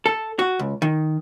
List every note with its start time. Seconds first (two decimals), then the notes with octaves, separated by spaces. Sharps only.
0.06 A4
0.39 F#4
0.59 C#2
0.82 D#3